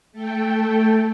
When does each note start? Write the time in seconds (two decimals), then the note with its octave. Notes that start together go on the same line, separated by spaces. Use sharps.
0.12 A3 A4 G5